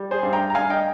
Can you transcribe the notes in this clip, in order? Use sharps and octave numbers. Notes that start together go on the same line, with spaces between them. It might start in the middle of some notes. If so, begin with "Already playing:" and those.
Already playing: G3
G#4 C5
G2
G5 A#5
A#5
G2 F5 G#5
D#5 G5